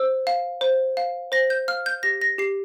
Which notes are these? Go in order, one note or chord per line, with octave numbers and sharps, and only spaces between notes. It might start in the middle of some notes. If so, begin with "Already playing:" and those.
Already playing: C5 E6
F5
C5
F5
C5 A#6
G6
F5 F6
G6
G4 A#6
A#6
G4 C7